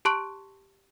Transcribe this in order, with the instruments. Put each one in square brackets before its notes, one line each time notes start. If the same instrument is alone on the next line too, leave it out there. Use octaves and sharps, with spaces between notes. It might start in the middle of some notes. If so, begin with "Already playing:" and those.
[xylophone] G4 A5 C6 C#6 F#6 D7